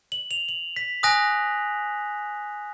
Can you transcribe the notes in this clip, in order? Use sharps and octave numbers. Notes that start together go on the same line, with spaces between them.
F#7
F7
F#7
B6
G#5 D#6 F#6 A#6